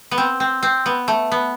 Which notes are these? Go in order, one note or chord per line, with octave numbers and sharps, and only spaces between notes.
B3
C4
C4
C4
B3
A3
B3